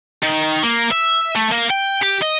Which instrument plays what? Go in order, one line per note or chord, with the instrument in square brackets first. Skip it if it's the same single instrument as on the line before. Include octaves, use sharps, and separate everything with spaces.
[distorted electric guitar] D#3
A#3
E5
A3
A#3
G5
G4
D#5